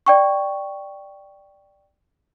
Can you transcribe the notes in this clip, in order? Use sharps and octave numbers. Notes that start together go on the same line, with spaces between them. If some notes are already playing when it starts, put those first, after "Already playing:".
D5 G5 C#6